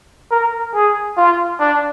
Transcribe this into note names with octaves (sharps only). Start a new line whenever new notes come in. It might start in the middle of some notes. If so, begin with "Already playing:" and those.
A#4
G#4
F4
D4